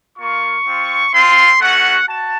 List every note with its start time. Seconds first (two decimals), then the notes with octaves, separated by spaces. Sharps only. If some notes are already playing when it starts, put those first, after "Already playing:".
0.18 A#3 F4 C#6
0.66 C4 F4
1.13 C4 F4 C6
1.60 A3 C#4 F#4 F#5
2.07 F#4 A5